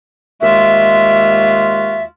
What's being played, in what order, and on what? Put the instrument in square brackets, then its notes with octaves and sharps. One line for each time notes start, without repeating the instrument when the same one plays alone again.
[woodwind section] D#2 G#3 F4 F#4 E5